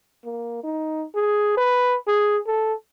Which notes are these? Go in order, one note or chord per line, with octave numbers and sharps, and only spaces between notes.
A#3
D#4
G#4
B4
G#4
A4